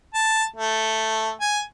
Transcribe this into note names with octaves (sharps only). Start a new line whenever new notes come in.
A5
A3
G#5